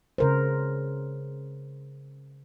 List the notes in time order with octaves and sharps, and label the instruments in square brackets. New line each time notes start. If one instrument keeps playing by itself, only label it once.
[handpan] C#3 A#4 C5